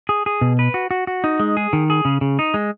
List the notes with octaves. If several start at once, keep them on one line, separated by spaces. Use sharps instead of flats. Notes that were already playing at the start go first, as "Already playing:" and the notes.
G#4
G#4
B2
B4
F#4
F#4
F#4
D#4
G#3
G#4
D#3
G#4
C#3
C#3
D#4
G#3